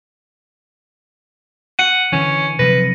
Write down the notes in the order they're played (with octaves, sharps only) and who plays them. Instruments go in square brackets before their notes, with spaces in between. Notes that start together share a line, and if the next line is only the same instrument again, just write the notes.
[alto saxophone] F#5 [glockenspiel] C#7 D#7
[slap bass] D3 E3 [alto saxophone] C#4
[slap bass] C3 F3 F#3 [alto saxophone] B4 [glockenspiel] A#6